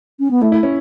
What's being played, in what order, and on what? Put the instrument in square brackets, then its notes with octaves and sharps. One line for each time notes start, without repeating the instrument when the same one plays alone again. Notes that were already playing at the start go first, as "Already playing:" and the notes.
[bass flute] C#4
B3
[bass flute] A3 [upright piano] E4
[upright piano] E4
C#4